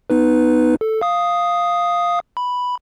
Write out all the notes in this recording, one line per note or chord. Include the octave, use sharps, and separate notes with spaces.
B3 D#4 B4
A4
F5 D#6
B5